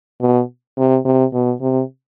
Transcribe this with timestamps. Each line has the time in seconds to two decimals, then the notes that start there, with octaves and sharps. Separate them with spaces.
0.21 B2
0.77 C3
1.05 C3
1.33 B2
1.61 C3